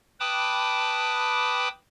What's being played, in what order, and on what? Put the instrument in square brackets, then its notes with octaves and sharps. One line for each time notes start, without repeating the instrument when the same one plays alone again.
[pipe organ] B4 G5 A5 B5 D6 D#6